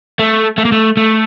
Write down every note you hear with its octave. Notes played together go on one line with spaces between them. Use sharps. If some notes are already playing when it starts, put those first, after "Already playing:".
A3
A3
A#3
A3
A3